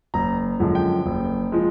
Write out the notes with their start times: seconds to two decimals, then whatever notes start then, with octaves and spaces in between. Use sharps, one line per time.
0.14 F#1 A#5
0.59 F#2 D3 F3 G#3
0.75 G5
1.06 F#1
1.52 F3 G#3